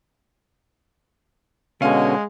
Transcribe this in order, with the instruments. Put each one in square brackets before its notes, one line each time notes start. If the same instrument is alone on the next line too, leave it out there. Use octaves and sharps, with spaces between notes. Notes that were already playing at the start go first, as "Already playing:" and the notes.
[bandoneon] B2 D3 [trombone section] G#3 [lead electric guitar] C#4 [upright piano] F5